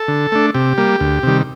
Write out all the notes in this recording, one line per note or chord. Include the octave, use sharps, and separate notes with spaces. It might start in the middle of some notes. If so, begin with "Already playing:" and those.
Already playing: A4
D3
A3 D4
C3 G4
G3 A#3
D2
C3 D#3 G3